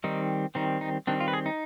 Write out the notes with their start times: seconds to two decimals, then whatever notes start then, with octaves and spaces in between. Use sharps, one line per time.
0.04 D#3 G3 C4 D#4
0.55 D#3 G3 C4 D#4
0.81 D#4
1.07 D#3 G3 C4 D4
1.20 F4
1.28 B4
1.33 G#4
1.46 D#4